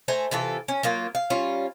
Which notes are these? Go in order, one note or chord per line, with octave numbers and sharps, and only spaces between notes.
A3 C5 G#5 A#5
C3 E3 F4 A4
C#4
F#3 A#3 F4
F5
G3 C#4 F4